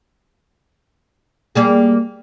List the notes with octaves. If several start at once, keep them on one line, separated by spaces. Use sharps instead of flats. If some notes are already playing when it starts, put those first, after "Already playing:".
G3 A#3 G#4